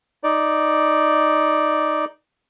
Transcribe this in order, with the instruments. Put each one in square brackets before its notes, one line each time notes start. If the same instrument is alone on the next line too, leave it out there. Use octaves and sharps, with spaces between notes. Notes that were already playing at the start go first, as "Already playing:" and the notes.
[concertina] D#4 D5